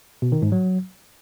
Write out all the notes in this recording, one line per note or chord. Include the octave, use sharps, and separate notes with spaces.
B2
D#3
G#2
F#3